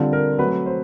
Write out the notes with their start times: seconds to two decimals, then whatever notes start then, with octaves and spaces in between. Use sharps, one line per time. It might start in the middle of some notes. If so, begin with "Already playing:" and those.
Already playing: D3 G3 C4 F4
0.13 A#4
0.38 F#3 A3 C4 B4
0.66 C5